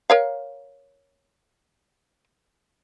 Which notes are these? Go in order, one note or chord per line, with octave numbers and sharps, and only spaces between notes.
A#4 C#5 F5